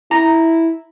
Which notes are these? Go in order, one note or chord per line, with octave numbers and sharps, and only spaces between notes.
E4 A#5